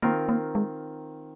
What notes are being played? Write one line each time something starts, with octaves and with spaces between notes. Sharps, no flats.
D#3 A#3 C4 F4 A#4
A#3
G#3